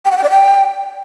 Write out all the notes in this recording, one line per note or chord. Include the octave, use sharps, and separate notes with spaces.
G5
F#5
G5
D5
G5